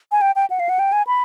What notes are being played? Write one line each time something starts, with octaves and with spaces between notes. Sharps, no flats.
G#5
G5
G5
F#5
F5
F#5
G5
G#5
B5